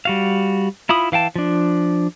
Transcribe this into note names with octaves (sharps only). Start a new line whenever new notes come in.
G3 F#4 F5
E4 F4 B5 D#6
E3 F5 G5 A5
F3 D4